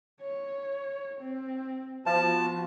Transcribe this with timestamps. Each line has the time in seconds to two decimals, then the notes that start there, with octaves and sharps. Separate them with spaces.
0.21 C#5
1.21 C4
2.06 F3 B3 F#4 A5